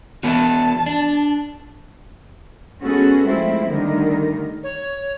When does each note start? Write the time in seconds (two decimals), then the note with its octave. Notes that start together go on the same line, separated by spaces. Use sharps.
0.23 E3 B3 F#4 A5
0.86 D4
2.80 G#3 B3 C#4 F#4 G#4 A4
3.28 F3 G#3 A3 C4 E4
3.70 D3 D#3 G3 A3 D#4 A#4
4.63 C#5